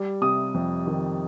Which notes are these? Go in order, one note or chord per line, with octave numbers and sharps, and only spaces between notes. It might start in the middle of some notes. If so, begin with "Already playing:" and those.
Already playing: G3
C3 D#6
F2
D#3